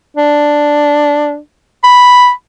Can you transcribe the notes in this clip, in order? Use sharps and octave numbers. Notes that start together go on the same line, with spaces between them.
D4
B5